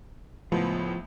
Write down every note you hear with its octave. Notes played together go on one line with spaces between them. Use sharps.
C#2 A2 F3 B3